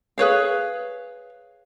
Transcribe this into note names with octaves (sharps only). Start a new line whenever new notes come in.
G#4 B4 C#5 F5